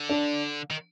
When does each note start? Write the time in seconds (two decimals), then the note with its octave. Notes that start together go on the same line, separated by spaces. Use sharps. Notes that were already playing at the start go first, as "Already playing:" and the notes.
Already playing: D3
0.09 D4
0.71 D#3